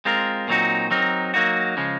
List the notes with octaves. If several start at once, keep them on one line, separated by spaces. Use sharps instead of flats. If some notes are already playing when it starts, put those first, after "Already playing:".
G#3 C4 F4 A#4
A#2 F#3 C4 D#4 F#4
F#3 C4 D#4 A#4
F#3 A#3 D#4 F#4
C#3 F3 G#3